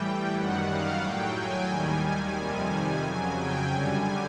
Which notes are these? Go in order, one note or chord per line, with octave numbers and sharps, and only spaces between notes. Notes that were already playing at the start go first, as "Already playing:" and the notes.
Already playing: A2 E3 G3 G5
F#2 D#3 G3 F#5
F5
A2 F#3 G5
G#5
D#2 D#3 G3 G#5
F2 C3 D#3 G3
F2 C#3 F#3 G#5
G5
F#2 D3 G3 G#5